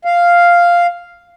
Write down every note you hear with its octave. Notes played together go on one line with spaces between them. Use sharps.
F5